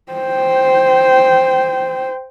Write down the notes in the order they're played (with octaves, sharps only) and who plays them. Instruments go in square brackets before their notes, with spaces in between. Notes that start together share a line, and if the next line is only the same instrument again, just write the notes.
[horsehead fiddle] C5 G5